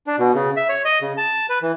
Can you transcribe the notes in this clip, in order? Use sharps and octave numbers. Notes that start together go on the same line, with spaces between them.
D4
B2
C#3
E5
C#5
D#5
C#3
A5
B4
E3